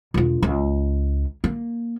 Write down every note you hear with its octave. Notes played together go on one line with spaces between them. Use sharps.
E1 F4
C#2
A#3